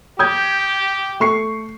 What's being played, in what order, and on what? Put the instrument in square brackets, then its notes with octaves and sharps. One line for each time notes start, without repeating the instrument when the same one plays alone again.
[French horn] G4 [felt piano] D#6 G6 G#6
[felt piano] A3 C#6 C7